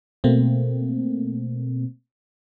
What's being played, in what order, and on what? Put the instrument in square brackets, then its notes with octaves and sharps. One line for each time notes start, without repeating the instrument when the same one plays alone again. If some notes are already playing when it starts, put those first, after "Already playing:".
[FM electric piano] B2 A3 A#3 C4